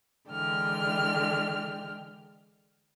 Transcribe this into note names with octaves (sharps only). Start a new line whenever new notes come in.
D3 E3 G#3 G5 F6